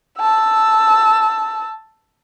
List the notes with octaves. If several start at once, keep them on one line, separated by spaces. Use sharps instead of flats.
A5 E6